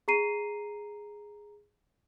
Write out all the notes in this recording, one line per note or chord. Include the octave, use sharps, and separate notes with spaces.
G#4 A#5 C7 D#7